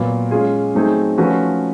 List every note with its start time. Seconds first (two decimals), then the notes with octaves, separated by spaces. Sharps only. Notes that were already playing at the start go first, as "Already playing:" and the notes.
Already playing: A#2 F#3 B3
0.31 G#3 C#4 F4 G#4
0.75 F#3 A3 C4 D#4 G#4
1.17 F3 A3 C#4 F#4 B4